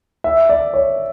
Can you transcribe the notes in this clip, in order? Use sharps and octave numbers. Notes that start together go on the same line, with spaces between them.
E5
D5
C#5